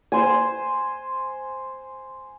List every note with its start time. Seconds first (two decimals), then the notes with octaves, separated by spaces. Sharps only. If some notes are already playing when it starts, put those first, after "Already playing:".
0.12 C5 G#5